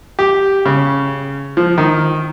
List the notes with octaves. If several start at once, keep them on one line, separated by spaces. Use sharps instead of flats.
G4
C#3
F3
D#3